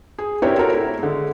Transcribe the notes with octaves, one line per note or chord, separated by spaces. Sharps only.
G#4
C4 D4 E4 G4 A#4 C#5
F#4 A4 A#4 C#5
A3 E4
D3 G#3